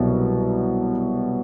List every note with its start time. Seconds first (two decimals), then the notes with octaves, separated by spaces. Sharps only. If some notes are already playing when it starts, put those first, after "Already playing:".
Already playing: C2 B2 F#3